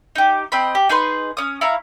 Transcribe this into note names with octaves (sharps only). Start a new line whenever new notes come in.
D#4 G4
C4 D#5 B5
G4
D#4 G#4 B4 C6
C#4 D#6
E4 C#5 F5 A#5